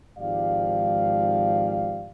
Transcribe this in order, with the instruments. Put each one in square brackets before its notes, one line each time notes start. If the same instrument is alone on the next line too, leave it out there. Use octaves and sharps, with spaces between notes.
[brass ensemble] G#1 G#2 F3 G4 D5 F5